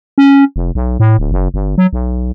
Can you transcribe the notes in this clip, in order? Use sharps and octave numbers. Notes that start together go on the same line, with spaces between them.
C#4
F1
B1
A2
D1
F#1
G1
F#3
B1